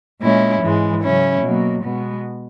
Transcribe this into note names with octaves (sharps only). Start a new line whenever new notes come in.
A#2 G#3 C#4 E4
G#2 E3 G#3
C#3 F#3 C#4 E4
B2 F#3 A#3
B2 G#3 B3